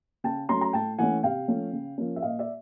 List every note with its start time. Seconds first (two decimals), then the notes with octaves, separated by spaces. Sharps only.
0.24 C#3 G5 A5
0.49 F#3 A3 C#4 A#5 C6
0.61 A#5
0.73 A2 G5 A5
0.99 E3 A3 C#4 F#5 G#5
1.23 C3 F5 G5
1.48 F3 A3 C#4
1.73 C#3
1.98 F3 A#3 C#4
2.16 E5
2.22 A#2 D#5 F5
2.39 D5 E5